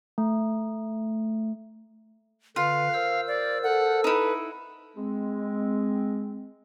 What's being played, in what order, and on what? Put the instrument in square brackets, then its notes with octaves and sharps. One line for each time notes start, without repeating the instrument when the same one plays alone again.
[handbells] A3
[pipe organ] D3 B4 [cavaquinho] F4 [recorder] F5
[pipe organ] A#4 C5 E6
[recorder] D5
[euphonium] A4 [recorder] F#5
[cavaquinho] D#4 E4 [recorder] B4
[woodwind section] G#3 C4